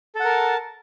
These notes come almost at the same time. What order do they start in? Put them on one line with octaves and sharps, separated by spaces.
A4 F#5 A#4 A5